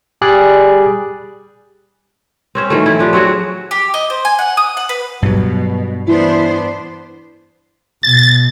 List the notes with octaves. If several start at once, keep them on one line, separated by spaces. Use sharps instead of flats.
G3 G#4 D5 F#6
C4 C#4 C5
D#3 E3 F#3 A3
E4
F3 D4 G4
F#3 C4 F#4 G#4
G4
D#5
C5
G#5
F#5
D#6
F#5
B4
G2 B2 F#3
E3 B3 D4 C5
B2 A6